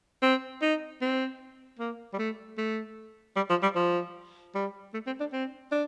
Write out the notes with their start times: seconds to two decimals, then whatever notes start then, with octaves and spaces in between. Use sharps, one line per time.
0.22 C4
0.62 D#4
1.01 C4
1.79 A#3
2.13 G3
2.19 A3
2.58 A3
3.36 G3
3.49 F3
3.62 G3
3.75 F3
4.55 G3
4.93 A3
5.06 C4
5.20 D4
5.32 C4
5.71 D4